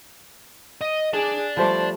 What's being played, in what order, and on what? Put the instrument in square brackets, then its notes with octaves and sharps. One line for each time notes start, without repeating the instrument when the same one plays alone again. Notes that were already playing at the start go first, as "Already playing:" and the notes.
[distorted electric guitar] D#5
[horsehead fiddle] G#4 [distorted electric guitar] D5 A5
[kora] F3 G3 A3 [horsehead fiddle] C5